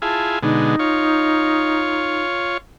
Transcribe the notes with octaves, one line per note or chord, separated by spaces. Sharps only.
E4 F4 G#4 A5
B2 D3 G#3 D#4
F4 C#5